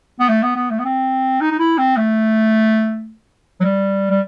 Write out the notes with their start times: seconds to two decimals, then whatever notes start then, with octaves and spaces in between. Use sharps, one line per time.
0.20 B3
0.29 A3
0.43 B3
0.56 B3
0.70 A3
0.79 B3
0.85 C4
1.41 D#4
1.51 D#4
1.59 E4
1.78 C4
1.97 A3
3.60 F#3
3.64 G3
4.10 G3